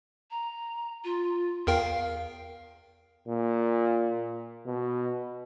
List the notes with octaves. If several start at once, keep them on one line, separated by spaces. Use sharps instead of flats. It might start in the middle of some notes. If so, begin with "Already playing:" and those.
A#5
F4
E2 A#4 F5 G5
A#2
B2